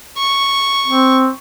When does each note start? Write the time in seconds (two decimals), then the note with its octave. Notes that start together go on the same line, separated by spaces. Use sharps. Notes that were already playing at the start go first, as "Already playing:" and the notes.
0.17 C#6
0.87 C4